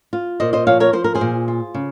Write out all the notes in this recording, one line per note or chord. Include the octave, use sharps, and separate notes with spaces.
F4
A#2 C5 D#5
C5 D#5
F3 C#5 F5
A#4 C#5
F3 C5
A#4
G#4 C5
A#2
F4
C#3